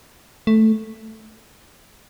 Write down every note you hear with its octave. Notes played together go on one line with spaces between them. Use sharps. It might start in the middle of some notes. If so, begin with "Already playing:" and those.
A3